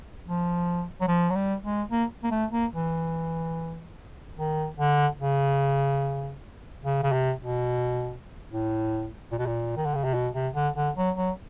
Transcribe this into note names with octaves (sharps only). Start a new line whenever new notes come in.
F3
F#3
F3
F#3
G3
G#3
A#3
A#3
A3
A#3
E3
D#3
D3
C#3
C#3
C#3
C3
B2
A2
A#2
B2
A#2
D#3
D3
C#3
C3
B2
C3
D3
D3
F#3
F#3